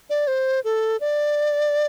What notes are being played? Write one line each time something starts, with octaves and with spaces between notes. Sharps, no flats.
D5
C5
A4
D5